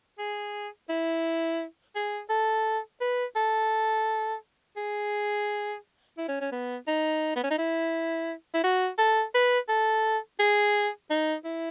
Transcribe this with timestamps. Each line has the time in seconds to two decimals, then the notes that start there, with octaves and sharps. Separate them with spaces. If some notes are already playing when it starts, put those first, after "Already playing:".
0.19 G#4
0.89 E4
1.95 G#4
2.29 A4
3.01 B4
3.36 A4
4.77 G#4
6.18 E4
6.28 C#4
6.41 C#4
6.52 B3
6.88 D#4
7.36 B3
7.44 C#4
7.50 D#4
7.58 E4
8.54 E4
8.64 F#4
8.98 A4
9.34 B4
9.69 A4
10.39 G#4
11.10 D#4
11.45 E4